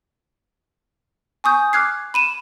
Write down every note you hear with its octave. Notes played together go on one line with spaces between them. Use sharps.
G#5 C#6 D#6 G6
D6 F6 F#6 G#6 C7
B5 D#7 E7